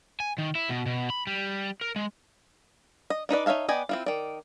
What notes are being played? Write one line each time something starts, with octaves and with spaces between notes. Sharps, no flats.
G#5
D#3
E4
B2
B2
B5
G3
A#4
G#3
D#5
D4 D#4 B4 D5
D#4 C#5 E5 F5 A5
B3 D5 D#5 G5 G#5
C4 E4 F4
D#3 D5